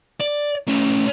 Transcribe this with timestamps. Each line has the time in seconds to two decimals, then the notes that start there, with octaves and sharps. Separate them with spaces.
0.21 D5
0.68 A3 C#4